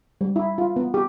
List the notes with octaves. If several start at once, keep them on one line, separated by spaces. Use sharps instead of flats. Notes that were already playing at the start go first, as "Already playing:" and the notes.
G3
E4
F4
B3
G4